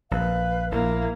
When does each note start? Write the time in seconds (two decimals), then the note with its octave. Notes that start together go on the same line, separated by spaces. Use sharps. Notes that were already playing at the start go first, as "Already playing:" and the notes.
0.11 A#1 B4 F5
0.72 A#1 A#3 E4